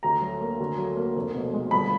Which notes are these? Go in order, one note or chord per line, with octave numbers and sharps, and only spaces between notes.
D2 A#5
F#3
A#3
D2
F#3
A#3
F1
B2
G#3
G1 B5